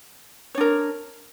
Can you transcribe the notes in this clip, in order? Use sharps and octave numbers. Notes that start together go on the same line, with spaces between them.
D4 A#4 C#5